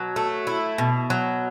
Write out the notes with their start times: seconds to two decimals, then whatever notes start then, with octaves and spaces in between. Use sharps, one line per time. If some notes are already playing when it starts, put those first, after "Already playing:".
Already playing: B2 F#3
0.16 A3
0.47 E4
0.78 B2
1.10 F#3